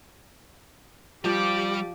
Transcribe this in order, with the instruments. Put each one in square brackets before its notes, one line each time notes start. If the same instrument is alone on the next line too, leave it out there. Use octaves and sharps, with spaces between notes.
[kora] F3 D5 G5 [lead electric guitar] G3 [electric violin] G4 D6